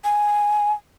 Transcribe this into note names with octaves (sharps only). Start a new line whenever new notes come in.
G#5